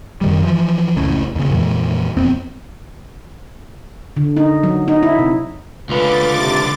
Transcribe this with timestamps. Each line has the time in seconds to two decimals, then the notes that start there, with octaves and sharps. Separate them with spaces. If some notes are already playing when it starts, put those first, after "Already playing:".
0.21 F#2 D#3 G3
0.43 E3 F3
0.97 F1 C#2 A2 C#4
1.35 D#2 C#3
1.50 F2 A#2 E3 G#3
2.17 E1 F2 B3 C4
4.17 D3
4.37 D#4
4.63 F#3
4.88 D#4
5.03 E4
5.19 C3
5.89 C#2 D3 F4 B4 D6 A6
6.38 C3